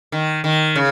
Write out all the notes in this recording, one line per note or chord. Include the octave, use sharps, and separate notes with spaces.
D#3
D#3
C#3